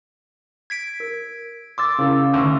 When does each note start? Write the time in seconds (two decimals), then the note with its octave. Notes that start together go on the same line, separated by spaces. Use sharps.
0.70 G#6 B6 D7
1.00 A#4
1.78 C6 D6 E6 A6
1.98 C#3 E4 A#4 F5
2.34 D2